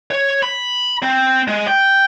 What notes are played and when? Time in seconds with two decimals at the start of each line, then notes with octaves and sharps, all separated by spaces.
0.11 C#5
0.43 B5
1.03 C4
1.48 G#3
1.68 G5